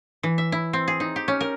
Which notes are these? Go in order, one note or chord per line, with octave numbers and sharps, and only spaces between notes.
E3
E5
E4
C4
G#4
D#4
G4
C#4
A#4